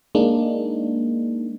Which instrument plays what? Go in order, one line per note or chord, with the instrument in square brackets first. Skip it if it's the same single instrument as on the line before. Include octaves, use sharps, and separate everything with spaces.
[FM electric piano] G#3 A#3 D4 D#4